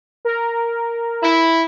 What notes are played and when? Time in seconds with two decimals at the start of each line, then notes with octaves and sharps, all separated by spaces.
0.25 A#4
1.23 E4